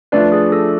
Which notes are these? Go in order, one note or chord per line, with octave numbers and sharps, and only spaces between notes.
F3 A3 D4 B4 D5
G#4
A4